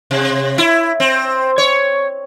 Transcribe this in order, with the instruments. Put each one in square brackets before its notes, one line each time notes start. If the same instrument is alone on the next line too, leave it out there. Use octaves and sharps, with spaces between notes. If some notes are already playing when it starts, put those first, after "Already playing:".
[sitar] C3
E4
C4
C#5